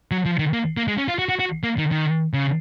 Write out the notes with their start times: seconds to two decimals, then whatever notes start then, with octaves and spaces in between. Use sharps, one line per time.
0.11 F#3
0.26 F3
0.39 D#3
0.53 A#3
0.77 A#3
0.88 G#3
0.98 C#4
1.08 F4
1.19 F#4
1.29 F#4
1.39 F#4
1.63 A#3
1.78 D#3
1.91 D#3
2.33 C#3